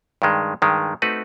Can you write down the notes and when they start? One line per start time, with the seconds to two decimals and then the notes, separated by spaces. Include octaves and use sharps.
0.22 G2 D#3 G#3
0.62 G2 D#3 G#3
1.02 A3 C4 D#4 F#4 B4